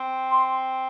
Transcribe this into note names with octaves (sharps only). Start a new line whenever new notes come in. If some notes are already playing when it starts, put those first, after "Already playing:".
Already playing: C4
C6